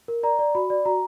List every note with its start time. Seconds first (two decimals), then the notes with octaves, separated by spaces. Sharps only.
0.08 A#4
0.23 D5 A#5
0.39 D5
0.55 F#4 B5
0.70 D5
0.85 F#4 A#5